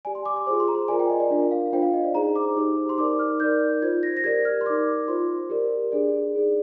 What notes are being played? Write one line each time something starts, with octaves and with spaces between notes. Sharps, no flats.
G4 D5 G#5
C6
D6
D6
F4 G#4 C5 C6
C6
A#5
C6
F4 A#4 D5 G#5
G5
D#5
D5
D4 F4 A#4
F5
D4 F4 C5 G5
F5
D#5
D5
D#4 G#4 C5 A#5
D6
D#4 G4 C5
C6
D#4 A#4 D5 D6
F6
D#4 A#4 D5 G6
F4 C5 G#6
A#6
A#6
G4 A#4 D5 G#6
F6
C6
D#4 A#4 D5 D6
F4 C5 C6
G4 A#4 D5
D4 G#4 D5
D#4 G#4 D5